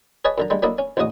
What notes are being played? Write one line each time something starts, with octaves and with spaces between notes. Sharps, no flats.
G#4 B4 C#5 D#5 A5
F#2 D3 A#5
D3 G3 G#3
F#3 A#3 D4 E4 A4 D#5
C#4
A1 D2 C#3 F#4 D#5 D#6